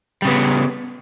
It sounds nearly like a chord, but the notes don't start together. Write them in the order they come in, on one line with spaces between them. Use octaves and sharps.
G3 C#3 B3